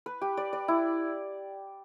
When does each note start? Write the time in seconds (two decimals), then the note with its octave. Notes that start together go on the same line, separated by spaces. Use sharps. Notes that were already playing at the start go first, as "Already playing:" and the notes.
0.06 B4
0.21 G4
0.37 D5
0.53 D5
0.68 E4